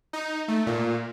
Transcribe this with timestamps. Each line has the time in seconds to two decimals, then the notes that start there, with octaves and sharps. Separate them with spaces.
0.13 D#4
0.48 A3
0.66 A#2